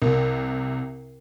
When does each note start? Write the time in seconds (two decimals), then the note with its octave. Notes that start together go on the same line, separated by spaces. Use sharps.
0.02 C2 C3 A#4